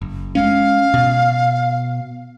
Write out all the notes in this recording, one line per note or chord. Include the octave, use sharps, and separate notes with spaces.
F#1
G#3 C#4 F5
B2